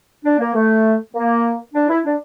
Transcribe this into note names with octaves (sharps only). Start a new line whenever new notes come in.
D4
A#3
A3
A#3
D4
E4
D4